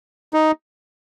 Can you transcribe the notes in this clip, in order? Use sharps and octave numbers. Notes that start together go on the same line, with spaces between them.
D#4